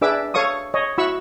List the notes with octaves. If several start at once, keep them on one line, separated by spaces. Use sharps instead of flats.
D4 G#4 B4 E5 D6 E6
A4 C#5 F5 C#6 D#6
C#5 D#5
E4 F#4 B5 C#6 E6